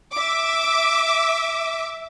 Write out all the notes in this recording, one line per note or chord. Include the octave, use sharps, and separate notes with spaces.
E5 D6